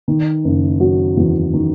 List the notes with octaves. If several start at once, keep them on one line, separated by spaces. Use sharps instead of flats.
D#3
F#1
F#3
E2
D#3